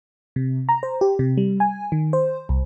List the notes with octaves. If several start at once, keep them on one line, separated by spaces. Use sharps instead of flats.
C3
A#5
C5
G4
C3
G3
G#5
D#3
C5
C2